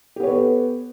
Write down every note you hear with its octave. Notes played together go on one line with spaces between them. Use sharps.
B3 G4 A4 B4 C#5